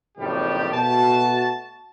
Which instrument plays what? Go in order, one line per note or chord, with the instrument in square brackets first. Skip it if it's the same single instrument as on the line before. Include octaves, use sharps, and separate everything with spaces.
[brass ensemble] F#1 F2 A2 D#3 G3 G4
B2 A3 F#4 A5